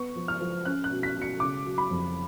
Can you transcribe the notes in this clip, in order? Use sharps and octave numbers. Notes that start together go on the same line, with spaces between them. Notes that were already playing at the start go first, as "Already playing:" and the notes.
Already playing: B3 C#6
F3
F6
F3
C#4 F#6
F#6
B2
B6
B2
C#7
C#3 D6
F#3
B5
F2